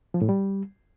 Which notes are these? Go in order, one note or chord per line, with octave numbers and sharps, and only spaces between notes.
F3
A2
G3